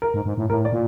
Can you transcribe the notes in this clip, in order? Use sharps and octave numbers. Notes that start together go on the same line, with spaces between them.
A#4
G#2
G#2
A2
A2 A#4
D5
A#2